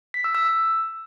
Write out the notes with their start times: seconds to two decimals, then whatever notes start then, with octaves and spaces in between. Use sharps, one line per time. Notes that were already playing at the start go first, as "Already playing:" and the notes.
0.14 B6
0.24 E6
0.35 E6
0.45 E6